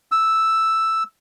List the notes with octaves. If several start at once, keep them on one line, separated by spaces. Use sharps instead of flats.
E6